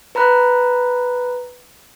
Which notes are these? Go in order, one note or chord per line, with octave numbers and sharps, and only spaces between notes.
B4 A#5 B5 F#6